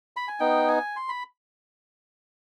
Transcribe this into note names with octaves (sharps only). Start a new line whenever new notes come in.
B5
G#5
B3 D#4 G5
G#5
C6
B5